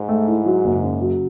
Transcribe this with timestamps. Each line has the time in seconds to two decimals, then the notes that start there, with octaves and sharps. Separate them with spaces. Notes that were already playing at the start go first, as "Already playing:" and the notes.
Already playing: G#2
0.09 A3
0.28 E4
0.46 F#3
0.65 F#1
0.83 C#3
1.01 F#3